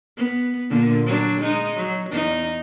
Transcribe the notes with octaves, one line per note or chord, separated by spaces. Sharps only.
B3
A#2 D3 A#3
F#3 D4
G#3 D#4
F#3
E2 D#4